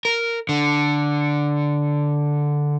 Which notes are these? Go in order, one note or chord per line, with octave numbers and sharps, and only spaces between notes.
A#4
D3